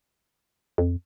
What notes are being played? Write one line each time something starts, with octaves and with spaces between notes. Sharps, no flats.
F2